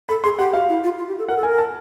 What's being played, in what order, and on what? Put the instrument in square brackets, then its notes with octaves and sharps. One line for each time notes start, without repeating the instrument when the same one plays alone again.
[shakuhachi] A4 [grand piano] B5
[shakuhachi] G#4 [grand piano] C6
[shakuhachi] G4 [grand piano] F#5
[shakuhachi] F#4 [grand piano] F5
[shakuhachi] E4
F4
F4
G4
A4
[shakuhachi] A#4 [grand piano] F#5
[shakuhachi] A4
[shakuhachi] A#4 [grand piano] G#5
[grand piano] A5